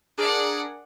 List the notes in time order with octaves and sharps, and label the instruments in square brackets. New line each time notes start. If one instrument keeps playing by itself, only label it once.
[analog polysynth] D4 G#4 A#4 [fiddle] D5 F#5